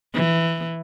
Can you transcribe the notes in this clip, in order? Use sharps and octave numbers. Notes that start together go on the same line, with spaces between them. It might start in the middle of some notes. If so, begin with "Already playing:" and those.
E3